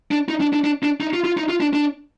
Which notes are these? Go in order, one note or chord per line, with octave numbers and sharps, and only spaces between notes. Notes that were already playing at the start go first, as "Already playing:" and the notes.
D4
D#4
D4
D4
D4
D4
D#4
F4
F4
D#4
F4
D4
D4